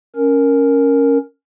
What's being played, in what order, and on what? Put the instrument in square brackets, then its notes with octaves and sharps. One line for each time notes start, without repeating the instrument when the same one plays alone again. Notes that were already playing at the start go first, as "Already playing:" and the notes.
[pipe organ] C#4 A#4